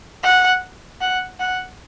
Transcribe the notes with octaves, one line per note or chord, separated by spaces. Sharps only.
F#5
F#5
F#5